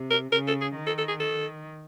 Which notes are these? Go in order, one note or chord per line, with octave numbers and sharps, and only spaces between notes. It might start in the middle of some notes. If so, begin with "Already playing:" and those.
Already playing: C3
A#4
C#3 A#4
A4
G#4
D#3
A4
A4
G#4
A4